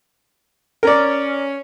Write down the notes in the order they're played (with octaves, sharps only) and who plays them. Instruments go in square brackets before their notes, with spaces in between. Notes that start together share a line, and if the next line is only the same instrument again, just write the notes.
[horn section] C#4 [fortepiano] A#4 D5